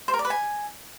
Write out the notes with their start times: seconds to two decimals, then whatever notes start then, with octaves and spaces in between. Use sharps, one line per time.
0.08 C5
0.14 A#4
0.19 D5
0.25 B4
0.30 G#5